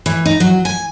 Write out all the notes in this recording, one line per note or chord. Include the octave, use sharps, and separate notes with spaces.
E3
D#4
F#3
G#5